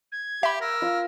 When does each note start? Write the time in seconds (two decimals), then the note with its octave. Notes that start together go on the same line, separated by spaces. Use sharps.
0.12 G#6
0.43 G4 E5 B5
0.61 A#4 E6
0.82 F4